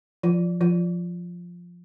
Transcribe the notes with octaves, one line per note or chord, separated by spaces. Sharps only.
F3 F4
F3 F4